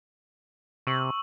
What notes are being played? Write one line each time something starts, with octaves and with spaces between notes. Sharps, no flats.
C3 C#6 E6 F#7